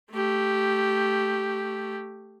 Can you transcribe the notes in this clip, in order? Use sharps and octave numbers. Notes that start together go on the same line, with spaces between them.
A3 G4